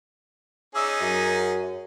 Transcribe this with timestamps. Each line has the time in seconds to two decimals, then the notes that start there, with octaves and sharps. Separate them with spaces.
0.75 C#4 D#4 G#4 D6 E6
1.00 F#2